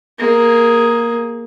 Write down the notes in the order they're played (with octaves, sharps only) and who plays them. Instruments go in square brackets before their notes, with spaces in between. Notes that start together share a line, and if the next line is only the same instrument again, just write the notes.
[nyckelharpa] A#3 G#4